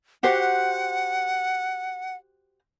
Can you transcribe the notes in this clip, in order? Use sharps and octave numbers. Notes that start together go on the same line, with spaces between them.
F#4 G4 C5 F#5